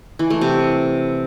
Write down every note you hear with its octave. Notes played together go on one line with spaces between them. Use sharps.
E3
A3
C3